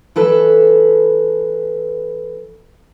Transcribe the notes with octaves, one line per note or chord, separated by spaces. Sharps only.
E3 A4 B4 A5